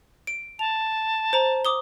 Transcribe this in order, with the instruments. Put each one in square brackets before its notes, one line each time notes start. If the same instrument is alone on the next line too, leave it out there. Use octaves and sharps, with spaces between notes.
[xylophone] D7
[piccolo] A5 [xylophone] F7
[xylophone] C5 A#5
D6 D#6 G7